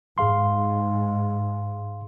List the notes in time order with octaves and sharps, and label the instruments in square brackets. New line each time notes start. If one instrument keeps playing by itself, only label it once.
[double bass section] G#2 [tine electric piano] G#4 F5 C6